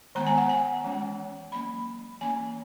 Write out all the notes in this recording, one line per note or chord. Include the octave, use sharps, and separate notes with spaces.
D#3 G#3 B3 A#5
G#5
F#5
G#5
E3 G#3 C#4
F#3 A#3 C#4 B5
E3 A#3 C#4 G#5